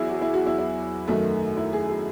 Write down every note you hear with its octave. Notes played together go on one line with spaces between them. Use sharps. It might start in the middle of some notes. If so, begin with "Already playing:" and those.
Already playing: E2 F#3 E4 G#4
F#4
E4
F#4
E4
E4
F#2 D#3 F#3 A3
E4
G#4
G#4